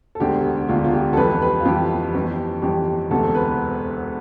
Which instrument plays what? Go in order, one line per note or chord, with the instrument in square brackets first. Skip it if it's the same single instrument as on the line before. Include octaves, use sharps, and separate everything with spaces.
[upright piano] A4
E1 D2 D3 G4
E1 D2 D3 F4
F4
G4
A4
F2 E3 G3 B4
B4
F4
F2 E3 G3 G4
G1 F2 E3 G3
G1 F2 E3 G3 G4
E1 D2 C3 E3 A3 A4
B4